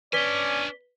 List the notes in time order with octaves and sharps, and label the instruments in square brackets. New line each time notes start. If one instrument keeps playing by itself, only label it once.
[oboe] C#4 [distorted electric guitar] D4 G#5 [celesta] B4 B6 G7 [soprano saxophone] D5